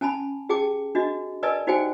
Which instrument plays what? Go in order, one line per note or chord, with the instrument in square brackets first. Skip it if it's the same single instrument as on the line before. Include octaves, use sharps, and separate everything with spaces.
[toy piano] C#4 G#5 A5 B5
G4 G#4 G5 A5 D6
D4 F#4 D#5
A#4 B4 D5 D#5 G#5 A5
D#4 F#4 G4 C5 G5 G#5